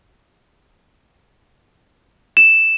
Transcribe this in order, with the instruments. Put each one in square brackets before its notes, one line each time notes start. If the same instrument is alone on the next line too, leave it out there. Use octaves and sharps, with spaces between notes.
[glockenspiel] E7